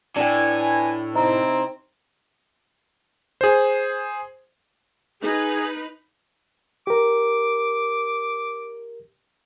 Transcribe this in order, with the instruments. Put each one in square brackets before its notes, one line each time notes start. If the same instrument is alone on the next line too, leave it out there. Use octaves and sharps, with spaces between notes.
[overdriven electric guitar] A2 [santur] D4 G5 [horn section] B4 G#5
[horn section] C3 E4 [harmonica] C4 [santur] D#4
[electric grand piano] G#4 C5
[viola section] D#4 B4 B5 [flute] G#4
[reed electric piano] G4 A#4 [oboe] D6